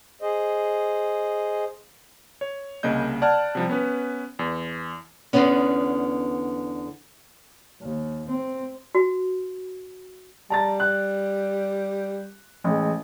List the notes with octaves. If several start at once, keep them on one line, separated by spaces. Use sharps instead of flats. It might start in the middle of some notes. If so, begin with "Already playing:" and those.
G#4 C5 D#5
C#5
C2 C#3 A#3 D#5 G6
D5 F#5 A5 F6 G#6
C3 F3 G3
B3 C#4 B4
E2
E2 G#2 D3 B3 C#4
D#2
C4
F#4
G3 A5 A#5 A6
F#6
A1 G#3